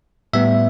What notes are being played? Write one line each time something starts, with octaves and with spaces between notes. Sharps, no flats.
A2 G3 B3 E5